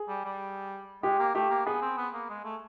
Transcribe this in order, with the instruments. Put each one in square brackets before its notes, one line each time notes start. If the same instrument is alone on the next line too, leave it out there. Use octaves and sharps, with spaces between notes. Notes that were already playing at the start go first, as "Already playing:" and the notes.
Already playing: [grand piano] G#4
[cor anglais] G3
G3
[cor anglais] G#3 [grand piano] G4
[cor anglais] A#3
[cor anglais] A3 [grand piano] G4
[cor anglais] A#3
[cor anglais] B3 [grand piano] G#4
[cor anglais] C4
B3
A#3
G#3
A3